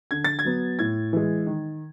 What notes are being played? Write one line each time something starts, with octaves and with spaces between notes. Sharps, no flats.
D3 G#6
A6
G#6
F#3 B3
A2 G#6
E3 G#3
D#3